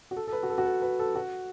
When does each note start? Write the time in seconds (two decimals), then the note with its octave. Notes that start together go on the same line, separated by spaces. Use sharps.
0.11 F#4
0.16 A4
0.27 A4
0.33 B4
0.43 F#4
0.50 A4
0.58 F#4
0.66 A4
0.82 B4
0.99 A4
1.15 F#4